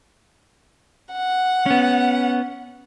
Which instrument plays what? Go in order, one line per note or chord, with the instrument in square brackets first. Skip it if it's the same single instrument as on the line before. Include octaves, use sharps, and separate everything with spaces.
[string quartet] F#5
[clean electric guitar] B3 C#4